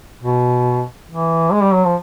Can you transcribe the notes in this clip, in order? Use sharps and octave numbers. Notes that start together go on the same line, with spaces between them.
B2
E3
G#3
G3
F#3
F3